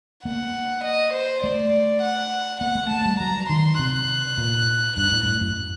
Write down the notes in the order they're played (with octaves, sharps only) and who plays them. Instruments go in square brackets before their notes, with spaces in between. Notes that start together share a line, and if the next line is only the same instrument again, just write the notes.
[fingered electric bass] A#3 [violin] F#5
[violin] D#5
C5
[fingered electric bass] A3 [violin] D5
[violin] F#5
[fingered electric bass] A#3 [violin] F#5
[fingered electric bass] A3
[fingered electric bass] A3 [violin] A5
[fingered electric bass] G3
[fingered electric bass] F#3 [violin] A#5
[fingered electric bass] D#3 [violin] C6
[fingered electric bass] C3 [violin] F#6
[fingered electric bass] A#2
[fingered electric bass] G2 [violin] F#6
[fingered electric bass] A2
A2
F#2